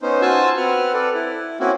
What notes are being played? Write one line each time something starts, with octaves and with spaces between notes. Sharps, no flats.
B3 C#4 D#4 C5
F4 F#4 C5 G#5 A5 E6
C4 B4 F#5 F6
A4 B4 D5
E4
A#3 C4 C#4 E4 F#4